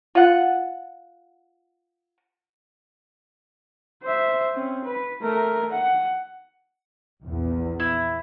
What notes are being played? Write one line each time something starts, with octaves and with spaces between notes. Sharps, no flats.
F4 F#5
C5 E5
C4 C#4
B4
A3 A#4
F#5
A#1 E2
E4